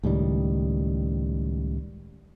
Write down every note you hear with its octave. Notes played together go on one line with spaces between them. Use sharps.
C#2 A2 D#3 G3